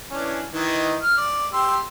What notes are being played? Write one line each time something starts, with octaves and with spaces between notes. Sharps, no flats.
E3 C#4 D4
D#3 E3 D#4
F6
D5
G4 C6 E6